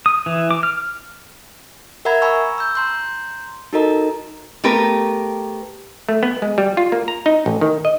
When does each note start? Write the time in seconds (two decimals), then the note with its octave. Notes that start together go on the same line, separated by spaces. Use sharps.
0.06 D#6
0.26 E3
0.51 D6
0.63 F6
2.05 A#4 E5 F#5 A#5 B5 G#6
2.22 G#5 A#5 B5 C#6 E6
2.58 E6 G6
2.75 A#5 C6 G6
3.73 D#4 F#4 A4 A#4 D#5 A#5
4.64 A3 B3 G4 A#4 B4
6.09 A3
6.23 B3
6.42 G#3
6.58 G3
6.77 F4
6.92 A#3
7.08 A#5
7.26 D#4
7.46 A1
7.61 D#3
7.85 D#5